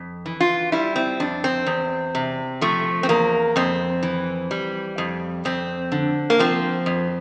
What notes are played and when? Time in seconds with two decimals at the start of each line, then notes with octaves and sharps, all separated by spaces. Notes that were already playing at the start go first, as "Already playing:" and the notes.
Already playing: F2
0.26 E3
0.40 F4
0.72 G3 E4
0.96 C4
1.20 F2 D4
1.44 C4
1.66 E2
2.15 C3
2.61 F3 A3
3.03 C4
3.09 E2 A#3
3.56 F2 C4
4.03 E3
4.51 G3
4.98 F2
5.45 F2 C4
5.92 D3
6.30 A#3
6.39 F3 C4
6.86 F2